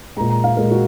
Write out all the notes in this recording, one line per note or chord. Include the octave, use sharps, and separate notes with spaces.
A#2 G#3 A#5
A#5
F5
A#2 G#3 A#4
F#4